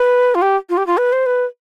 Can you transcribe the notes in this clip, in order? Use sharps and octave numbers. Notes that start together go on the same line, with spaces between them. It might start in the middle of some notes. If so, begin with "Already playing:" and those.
Already playing: B4
F4
G4
F4
G4
F4
B4
C5
B4